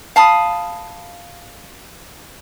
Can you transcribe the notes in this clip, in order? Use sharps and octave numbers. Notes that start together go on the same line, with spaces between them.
F5 A5 B5 D#6